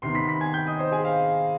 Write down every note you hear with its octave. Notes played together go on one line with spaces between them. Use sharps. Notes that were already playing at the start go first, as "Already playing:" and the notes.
C3 D#3 B3 C6 C7
B5 B6
B5 B6
G#5 G#6
G5 G6
D#5 D#6
C5 C6
G#4 G#5
F5